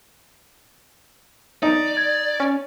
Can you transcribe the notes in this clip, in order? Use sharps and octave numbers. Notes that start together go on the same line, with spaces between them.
D#4 D5
G#6
C#4